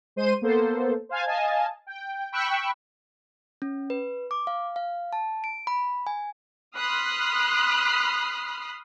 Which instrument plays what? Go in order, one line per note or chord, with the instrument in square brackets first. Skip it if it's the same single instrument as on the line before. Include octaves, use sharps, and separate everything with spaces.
[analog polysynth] G#3 C5 C6 D#7
A#3 B3 A4 C5
C5 F5 G#5 A5
D#5 F5 G#5 A5
G5
G5 B5 C#6 E6 F#6
[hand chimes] C#4
B4
D6
F5
F5
A5
D7
B5
G#5
[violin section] B5 C6 D#6 F6 F#6